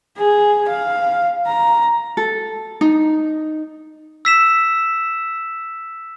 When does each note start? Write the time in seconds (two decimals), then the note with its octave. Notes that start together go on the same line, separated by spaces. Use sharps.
0.17 G#4
0.68 F5
1.47 A#5
2.17 A4
2.81 D#4
4.25 E6 B6 E7